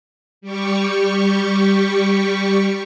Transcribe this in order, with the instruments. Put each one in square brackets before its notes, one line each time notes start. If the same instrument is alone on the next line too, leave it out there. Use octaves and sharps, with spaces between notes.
[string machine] G3 G4 C#6